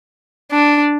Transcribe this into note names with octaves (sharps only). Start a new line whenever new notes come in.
D4